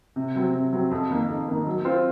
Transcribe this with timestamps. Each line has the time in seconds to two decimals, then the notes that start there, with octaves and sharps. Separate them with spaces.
0.16 C3
0.36 F#3 C4
0.54 C3
0.73 F#3 C4
0.91 F2
1.11 D#3 A#3
1.29 F2
1.48 D#3 A#3
1.67 F#3
1.85 C4 F4 C5